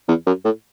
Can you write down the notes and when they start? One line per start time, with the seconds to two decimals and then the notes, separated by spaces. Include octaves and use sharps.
0.08 E2
0.26 F#2
0.44 A2